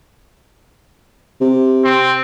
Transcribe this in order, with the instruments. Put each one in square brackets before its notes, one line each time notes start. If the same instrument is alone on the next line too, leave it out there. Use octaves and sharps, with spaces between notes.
[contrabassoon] C3
[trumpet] C4